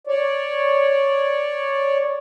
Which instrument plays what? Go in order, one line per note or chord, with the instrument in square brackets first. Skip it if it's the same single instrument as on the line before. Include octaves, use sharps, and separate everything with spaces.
[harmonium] C#5 D5